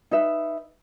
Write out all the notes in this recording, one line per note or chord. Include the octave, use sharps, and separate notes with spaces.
D#4 B4 E5